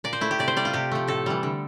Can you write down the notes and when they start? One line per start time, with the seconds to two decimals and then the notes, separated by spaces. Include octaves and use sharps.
0.04 A#2 D5
0.13 C5
0.21 A3 E4
0.31 G4
0.39 C3 D5
0.48 C5
0.57 G3 D5
0.65 F4
0.73 C3 G4
0.92 F3 A3
1.08 A2 A4
1.26 E3 G3
1.43 D3